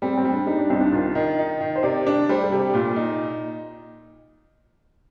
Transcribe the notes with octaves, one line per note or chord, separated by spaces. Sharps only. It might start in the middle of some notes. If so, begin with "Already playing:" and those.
G3 C4
C4
G3
D4
G3 D#4
D4
C2 C4
D#4
D4
D#3 F4
D#3 D#5
D#4
D#3
C5
C3 D5
D4 D5
G3 C5
A4
C3
G4
A#2 F4
D#4